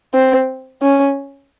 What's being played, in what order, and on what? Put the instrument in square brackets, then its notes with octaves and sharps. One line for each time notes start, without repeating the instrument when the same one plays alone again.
[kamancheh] C4
C#4